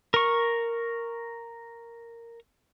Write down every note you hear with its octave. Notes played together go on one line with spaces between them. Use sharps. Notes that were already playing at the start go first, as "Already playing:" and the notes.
A#4 C#6